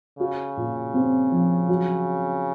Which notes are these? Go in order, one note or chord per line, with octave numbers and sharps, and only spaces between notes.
C#3 F#4
A#2
C4
F3
F#3